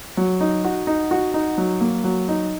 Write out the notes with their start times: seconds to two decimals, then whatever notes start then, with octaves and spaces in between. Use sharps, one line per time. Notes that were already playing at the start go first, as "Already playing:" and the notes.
0.17 F#3
0.41 D#4
0.64 F#4
0.87 D#4
1.11 F#4
1.34 D#4
1.58 F#3
1.81 A#3
2.04 F#3
2.28 D#4